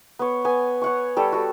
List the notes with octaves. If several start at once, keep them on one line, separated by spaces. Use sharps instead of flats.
B3 C#5
B3 G#5
C#5 F#5 C#6
G3 A4 C#5
F#4 A4